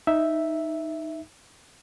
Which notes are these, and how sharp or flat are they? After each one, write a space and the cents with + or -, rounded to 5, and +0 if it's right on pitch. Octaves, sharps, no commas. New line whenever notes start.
D#4 +0 E5 +0